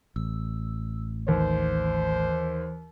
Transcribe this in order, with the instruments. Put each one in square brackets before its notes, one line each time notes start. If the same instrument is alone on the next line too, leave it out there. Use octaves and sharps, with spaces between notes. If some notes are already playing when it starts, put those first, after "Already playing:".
[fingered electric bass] A1 [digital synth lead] E6
[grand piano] D#2 [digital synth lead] E3 [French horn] C5